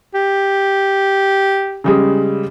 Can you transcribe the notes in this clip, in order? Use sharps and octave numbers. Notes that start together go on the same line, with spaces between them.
G4
C#3 G3 G#3